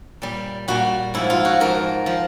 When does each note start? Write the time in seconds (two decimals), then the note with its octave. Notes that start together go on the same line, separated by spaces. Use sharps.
0.22 A#2 G3
0.68 A#2 G3 F#4
1.14 G#2 F3 E4
1.30 F4
1.45 F#4
1.60 G#2 F3 A#4
2.06 F3